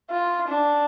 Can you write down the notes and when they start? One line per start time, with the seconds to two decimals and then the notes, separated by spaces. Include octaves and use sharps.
0.10 F4
0.48 D4